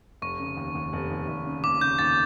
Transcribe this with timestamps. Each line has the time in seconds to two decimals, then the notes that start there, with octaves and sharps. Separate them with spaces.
0.22 F1 C#6
0.39 C#3
0.57 D#2
0.75 D#2
0.93 F1
1.10 D#2
1.28 F1
1.46 C#3
1.64 D#2 D6
1.81 C#3 G6
1.99 D#2 A6